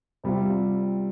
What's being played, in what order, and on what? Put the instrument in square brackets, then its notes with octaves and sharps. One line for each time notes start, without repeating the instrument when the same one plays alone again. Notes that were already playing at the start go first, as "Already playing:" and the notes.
[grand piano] C3 G3 C4 F4